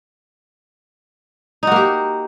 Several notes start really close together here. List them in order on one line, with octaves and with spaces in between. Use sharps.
D#4 F#4 A#3 G4